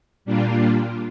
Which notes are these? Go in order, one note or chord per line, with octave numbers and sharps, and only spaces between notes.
A#2 G3 A#3 D4 F4